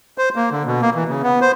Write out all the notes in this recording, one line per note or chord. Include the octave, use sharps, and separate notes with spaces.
C5
A#3
D3
B2
A#3
E3
C#3
B3
C5